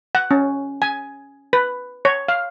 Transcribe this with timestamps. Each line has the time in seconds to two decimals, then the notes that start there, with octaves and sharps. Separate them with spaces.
0.15 F#5
0.31 C#4
0.82 G#5
1.53 B4
2.05 C#5
2.28 F5